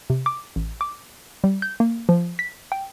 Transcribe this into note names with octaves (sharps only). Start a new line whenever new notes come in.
C3
D6
A1
D6
G3
G6
A#3
F3
B6
G5